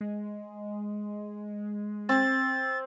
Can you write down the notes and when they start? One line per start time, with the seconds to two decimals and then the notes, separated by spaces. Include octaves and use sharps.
0.01 G#3
2.09 C4 A6